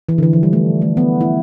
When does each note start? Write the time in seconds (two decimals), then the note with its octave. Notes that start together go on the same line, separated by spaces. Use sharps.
0.09 E3
0.18 D3
0.23 E3
0.33 F3
0.43 G3
0.53 A3
0.82 A3
0.97 B3
1.21 E4